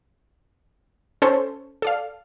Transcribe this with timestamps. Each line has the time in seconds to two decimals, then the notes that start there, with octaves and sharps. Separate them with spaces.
1.22 C#4 A4 C5 C#5
1.82 A4 D5 F5